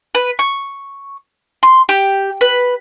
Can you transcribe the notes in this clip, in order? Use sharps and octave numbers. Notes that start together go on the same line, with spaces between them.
B4
C#6
C6
G4
B4